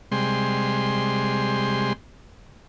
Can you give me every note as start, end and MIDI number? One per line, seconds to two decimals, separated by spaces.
0.12 1.93 48
0.12 1.93 55
0.12 1.93 56
0.12 1.93 84